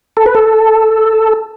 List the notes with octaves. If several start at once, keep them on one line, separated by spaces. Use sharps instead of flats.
A4
B4
A4